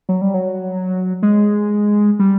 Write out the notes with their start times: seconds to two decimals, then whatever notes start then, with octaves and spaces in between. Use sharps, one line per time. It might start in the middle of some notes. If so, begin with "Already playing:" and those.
0.09 F#3
0.22 G3
0.34 F#3
1.23 G#3
2.19 G3